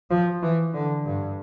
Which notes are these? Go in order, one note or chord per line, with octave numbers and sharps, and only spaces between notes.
F3
E3
D3
G2